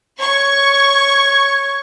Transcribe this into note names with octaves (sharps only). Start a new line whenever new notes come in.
C#5 C#6